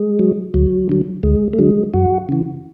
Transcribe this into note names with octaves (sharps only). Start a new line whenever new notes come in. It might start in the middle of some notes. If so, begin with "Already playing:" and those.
Already playing: G#3
F#3
D2 F#3
D3 F#3
D2 G#3
A3
D3 F#3 G#3
F#2 F#4
C#3 E3